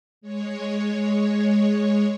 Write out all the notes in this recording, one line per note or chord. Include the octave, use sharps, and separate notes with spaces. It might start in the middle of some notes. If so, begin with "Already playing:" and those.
G#3 C#5